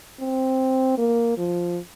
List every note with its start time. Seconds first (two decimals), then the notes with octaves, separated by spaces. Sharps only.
0.20 C4
0.98 A#3
1.37 F3